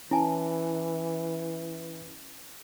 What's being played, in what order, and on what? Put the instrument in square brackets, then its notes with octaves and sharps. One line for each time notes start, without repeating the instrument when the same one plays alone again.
[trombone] E3 [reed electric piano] C#4 [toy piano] E4 G#5 A5